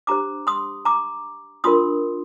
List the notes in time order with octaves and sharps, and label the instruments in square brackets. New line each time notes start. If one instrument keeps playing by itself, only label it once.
[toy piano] D4 G4 C5 A#5 D6
C6 D#6
A#5 D6
D4 F4 A#4 C6 D#6